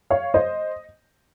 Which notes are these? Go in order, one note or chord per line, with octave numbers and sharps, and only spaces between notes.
C#5 F5
C5 D#5